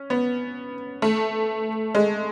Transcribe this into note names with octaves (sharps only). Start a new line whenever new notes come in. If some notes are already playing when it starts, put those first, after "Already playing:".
Already playing: C#4
B3
A3
G#3